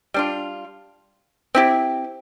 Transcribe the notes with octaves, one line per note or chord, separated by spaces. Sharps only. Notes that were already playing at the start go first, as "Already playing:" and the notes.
G3 D4 F4
C4 E4 G4